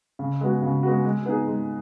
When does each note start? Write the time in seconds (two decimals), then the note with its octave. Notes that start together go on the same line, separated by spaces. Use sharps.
0.19 C#3
0.41 G#3 B3 F#4
0.62 C#3
0.83 G#3 B3 F#4
1.05 G#3
1.25 B3 D#4 G#4
1.47 G#3